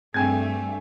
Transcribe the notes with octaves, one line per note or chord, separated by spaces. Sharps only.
G2 A3 C4 G#4 G5 G#5 G#6